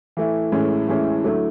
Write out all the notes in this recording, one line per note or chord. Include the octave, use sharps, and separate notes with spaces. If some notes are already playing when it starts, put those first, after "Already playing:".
E3 A3 E4
A2 E3 G#3 C#4 E4
A2 E3 G#3 C#4 E4
D3 F#3 A3 E4